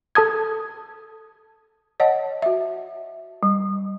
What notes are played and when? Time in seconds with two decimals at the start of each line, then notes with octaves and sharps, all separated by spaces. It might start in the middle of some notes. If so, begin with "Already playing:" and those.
0.15 A4 A5 D#6 G#6
2.00 C#5 D#5 F#5 A5
2.42 F#4 E5
3.43 G3